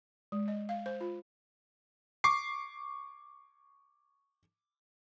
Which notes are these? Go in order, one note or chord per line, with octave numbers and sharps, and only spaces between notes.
G#3
D#5
F5
C5
F4
C#6 D6 C7